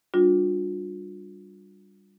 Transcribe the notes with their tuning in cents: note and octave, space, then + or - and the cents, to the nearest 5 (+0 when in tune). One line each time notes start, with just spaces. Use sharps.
G3 +0 D4 +5 F4 +40